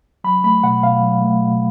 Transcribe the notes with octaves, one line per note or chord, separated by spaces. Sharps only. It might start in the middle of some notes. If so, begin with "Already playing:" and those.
F#3 B5
A3 B5
B2 F#5
B2 F5
F#3
A3
B2